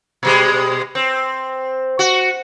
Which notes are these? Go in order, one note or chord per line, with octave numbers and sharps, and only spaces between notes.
B2 G3 G#3
C4
F#4